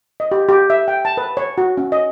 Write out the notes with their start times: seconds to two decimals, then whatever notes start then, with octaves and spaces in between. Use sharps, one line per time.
0.20 D#5
0.32 G4
0.49 G4
0.70 E5
0.88 G5
1.05 A5
1.17 B4
1.37 C#5
1.58 F#4
1.77 C#4
1.92 D#5